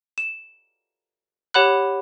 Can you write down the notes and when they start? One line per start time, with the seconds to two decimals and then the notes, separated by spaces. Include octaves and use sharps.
0.18 E7
1.54 G4 C#5 F#5 B5 F#6